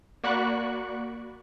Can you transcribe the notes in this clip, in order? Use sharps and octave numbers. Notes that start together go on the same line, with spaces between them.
A#3 F#4 D5 B5 C#6 F#6